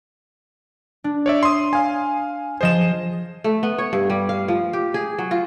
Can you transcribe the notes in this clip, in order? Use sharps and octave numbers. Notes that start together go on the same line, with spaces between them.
D4
C#5 D5 E5
C6 D#6
F5 G#5
F3 G#4 C5 D#5 E7
A3
B3
C#5
G2
G3
F5
F3
G4
G#4
F#3
F4